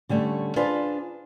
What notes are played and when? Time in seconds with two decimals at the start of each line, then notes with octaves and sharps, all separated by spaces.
0.09 D3 G3 A3 C#4
0.56 D4 F4 G#4 B4 C5